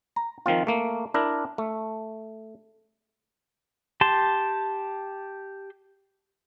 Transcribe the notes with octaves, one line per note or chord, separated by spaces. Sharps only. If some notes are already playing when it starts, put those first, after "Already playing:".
A#5
D#3 F3 C4 F4
A3 A#3
D4 E4 A#4
A3
G4 A5 C6